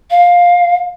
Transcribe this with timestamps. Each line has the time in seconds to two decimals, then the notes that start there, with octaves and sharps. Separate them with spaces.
0.11 F5